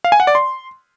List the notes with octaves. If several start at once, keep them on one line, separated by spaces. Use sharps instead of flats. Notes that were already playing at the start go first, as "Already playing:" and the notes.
F5
G#5
F#5
D5
C6